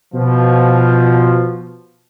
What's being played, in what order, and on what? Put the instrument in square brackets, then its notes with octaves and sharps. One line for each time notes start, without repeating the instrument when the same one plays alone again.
[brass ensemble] B2 F3